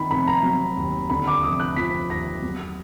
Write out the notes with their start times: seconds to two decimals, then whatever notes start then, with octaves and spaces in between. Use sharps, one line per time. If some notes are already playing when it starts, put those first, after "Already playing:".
Already playing: D#3 B5
0.11 F1 B5
0.27 A#5
0.43 F#3
0.77 D#2
1.10 D3 B5
1.27 D6
1.43 F1 D#6
1.60 F#6
1.76 F3 B6
2.10 D#2 A#6
2.42 F#3